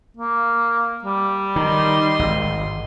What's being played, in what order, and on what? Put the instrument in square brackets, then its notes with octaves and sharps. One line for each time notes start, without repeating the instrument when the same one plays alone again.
[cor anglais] A#3
G3
[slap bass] D#3 [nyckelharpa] D#5 C6
[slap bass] G#1